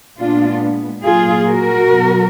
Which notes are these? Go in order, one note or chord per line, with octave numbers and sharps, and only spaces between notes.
A#2 G#3 B3 D4 F4
A#2 F#3 A#3 F4 G#4
F#4 A#4
B2 F#3 B3